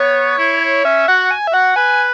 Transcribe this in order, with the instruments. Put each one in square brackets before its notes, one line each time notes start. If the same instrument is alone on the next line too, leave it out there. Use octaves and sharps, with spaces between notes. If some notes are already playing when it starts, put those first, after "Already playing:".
Already playing: [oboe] B3 [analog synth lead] C#5
[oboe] E4
[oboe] C#4 [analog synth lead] E5
[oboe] F#4 [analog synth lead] F#5
[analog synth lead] G#5
E5
[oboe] F#4 [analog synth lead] F#5
[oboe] B4 [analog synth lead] G#5